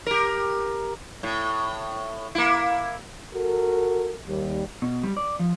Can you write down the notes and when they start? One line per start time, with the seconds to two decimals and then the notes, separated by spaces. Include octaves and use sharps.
0.06 G4 A#4
1.23 A2
2.35 A#3 E4
3.33 F#4 A4 A#4
4.27 D#2 G3
4.82 B2
5.03 G3
5.17 D5
5.39 F3